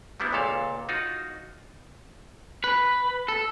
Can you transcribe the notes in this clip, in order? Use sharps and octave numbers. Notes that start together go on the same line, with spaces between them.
F#3 G3 B3 D4 E4
C#2 A#2 A4 F5
D#4 F4 F#4
B4
A4